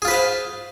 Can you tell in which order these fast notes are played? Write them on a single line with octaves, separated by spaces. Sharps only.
G#4 F4 B4 C5 F5